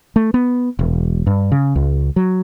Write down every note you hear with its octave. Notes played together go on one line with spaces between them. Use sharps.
A3
B3
E1
G2
C#3
C#2
F#3